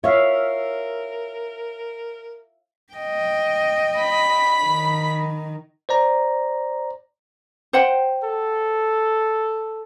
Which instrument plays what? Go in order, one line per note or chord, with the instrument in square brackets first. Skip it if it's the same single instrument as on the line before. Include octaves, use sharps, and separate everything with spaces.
[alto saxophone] A#4 [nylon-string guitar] C#5 [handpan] E5 F5
[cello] D#5 G5
[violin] B5 B6
[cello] D#3
[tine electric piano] C5 D5 A#5
[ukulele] C5 F#5 G5
[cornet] A4